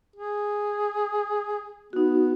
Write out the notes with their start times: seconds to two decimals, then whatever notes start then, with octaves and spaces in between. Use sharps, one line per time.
0.16 G#4
1.93 B3 D#4 F#4